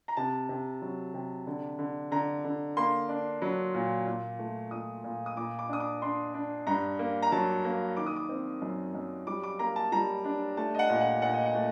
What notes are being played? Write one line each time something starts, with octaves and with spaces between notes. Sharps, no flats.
A#5
C3 A5
C3
F#3
C3
D3
D3
D3 A#5
D3
A#3 C6
D4
F#3
A#2
A#2
A3
A#2 D#6
A#2
D#6
A#2 D6
D6
D4 D#6
D6
D4 C6
D4
G2 A#5
A#3
A#5
F#3 A5
A#3
D#3 D6
D#6
D6
C4
F#2
F#2
G3 D6
D6
A#3 A#5
A5
G3 A#5
D4
A3 A5
D#5
F#5
A#2
F#5
A#2 F#5
D#5
F#5
A3